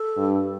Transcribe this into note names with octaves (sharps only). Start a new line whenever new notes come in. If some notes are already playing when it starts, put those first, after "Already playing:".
Already playing: A4
G2